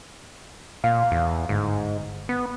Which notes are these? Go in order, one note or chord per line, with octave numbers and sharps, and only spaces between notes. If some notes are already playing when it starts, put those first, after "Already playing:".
A#2 F5
E2
G1 G#2
B3